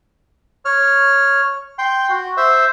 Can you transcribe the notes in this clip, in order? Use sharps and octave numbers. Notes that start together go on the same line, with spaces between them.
C#5 F6
G5 C6
F#4
C5 E5